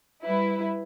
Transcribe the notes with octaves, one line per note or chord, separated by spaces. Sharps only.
G3 E4 B4